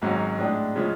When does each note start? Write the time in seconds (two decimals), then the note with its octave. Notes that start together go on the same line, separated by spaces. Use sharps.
0.02 G#1 G#2 F#3 C#4 F#4
0.38 A2 G#3 D4 G#4
0.75 C#3 F3 G#3 C#4